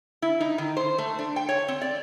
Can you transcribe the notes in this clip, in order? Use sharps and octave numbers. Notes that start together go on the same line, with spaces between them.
E4
D#4
D#3
C5
A3
D4
G5
C#5
C4
D5